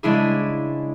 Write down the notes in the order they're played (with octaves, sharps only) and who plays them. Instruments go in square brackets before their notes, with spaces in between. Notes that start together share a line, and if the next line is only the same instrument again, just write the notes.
[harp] C#3 G#3 D4 E4 G#4